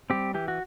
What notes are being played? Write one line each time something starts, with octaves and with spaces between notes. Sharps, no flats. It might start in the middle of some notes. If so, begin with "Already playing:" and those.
G3 C4 G4
E3 G4
F#4